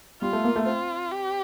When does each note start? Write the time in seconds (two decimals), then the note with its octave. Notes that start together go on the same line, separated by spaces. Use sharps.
0.22 G3 F4
0.33 A3
0.44 A#3
0.56 A3
0.66 C4 F4
1.12 G4